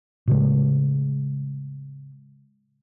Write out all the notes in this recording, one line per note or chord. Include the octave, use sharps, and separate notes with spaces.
A2 C#3 G#3